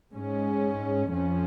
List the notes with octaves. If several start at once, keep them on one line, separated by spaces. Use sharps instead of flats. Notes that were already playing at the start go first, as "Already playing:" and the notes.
G#2 G#3 C#4
F2 F3 C#4